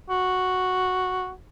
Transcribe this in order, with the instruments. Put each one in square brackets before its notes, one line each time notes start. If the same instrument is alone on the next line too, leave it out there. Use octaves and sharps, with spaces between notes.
[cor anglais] F#4